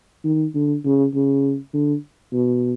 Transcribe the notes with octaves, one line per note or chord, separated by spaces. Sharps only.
D#3
D3
C#3
C#3
D3
B2